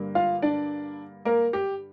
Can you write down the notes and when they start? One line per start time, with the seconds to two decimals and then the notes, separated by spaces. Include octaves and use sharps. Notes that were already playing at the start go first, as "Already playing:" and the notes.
Already playing: G2 D3 G3 A#3
0.15 F4 F5
0.42 D4 D5
1.25 A#3 A#4
1.53 G4